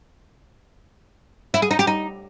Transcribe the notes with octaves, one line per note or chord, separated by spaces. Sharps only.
E4
G#4
D#4
G4
D#4